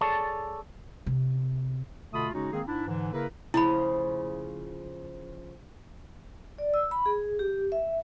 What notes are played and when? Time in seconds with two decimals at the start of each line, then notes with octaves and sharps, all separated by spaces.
0.01 G#4 A4 C#5 D5 A5
1.06 C3
2.13 B2 D3 A3 F4 B5 D#6
2.32 C#3 G#3 C#4 D#4 F#4
2.52 D#3 G#3 A#3 C4 G#4
2.67 G#2 D4 E4
2.87 G#2 D3 E3
3.12 C#3 A#3 E4 A#4 B4
3.54 C#3 F3 A3 E4 B5
6.58 D5
6.74 E6
6.91 B5
7.06 G#4
7.39 G4
7.72 E5